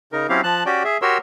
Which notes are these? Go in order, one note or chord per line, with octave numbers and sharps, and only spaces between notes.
C#3 D#4 A#4
F#3 C4 C#4 E4 G4 F5
F3 A5 F#6
C#4 F#4 G4 D5 G5
G#4 E5
F#4 G4 A#4 C#5 C6 E6